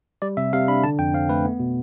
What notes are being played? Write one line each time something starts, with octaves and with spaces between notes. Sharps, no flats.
G3 D5
C3 E5
C3 F5
D4 B5
D3 A5
F2 G5
C4 F5
A3 B4
B3
B2